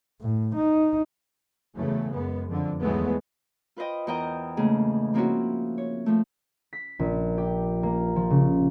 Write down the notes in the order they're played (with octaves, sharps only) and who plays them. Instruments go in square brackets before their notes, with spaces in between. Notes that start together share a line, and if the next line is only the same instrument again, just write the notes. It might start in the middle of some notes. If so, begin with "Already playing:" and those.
[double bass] A2
D#4
[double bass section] E2 C#3 F#3 A3
F#2 G#3 B3
F2 D3
E2 G#2 F#3 G#3 A3 B3
[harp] F4 B4 C5 D#5 G5
E2 A#4 D#5 G5 A#5 G6
G#2 C#3 A3 A#3 G#4
F3 A#3 C4 C#4 E4 F#4
C#5
F3 A3
B6
A#1
G4
A#3
F3
C#3